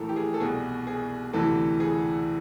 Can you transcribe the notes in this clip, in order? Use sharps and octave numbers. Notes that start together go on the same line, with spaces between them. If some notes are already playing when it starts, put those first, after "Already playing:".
Already playing: A#1 A2 E3 A4 A#4
G4
G#4
A4
C2 B2 G#4
G#4
D2 C3 E3 A4
G#4